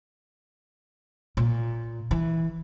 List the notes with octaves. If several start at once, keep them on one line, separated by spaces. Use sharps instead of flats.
A#2
E3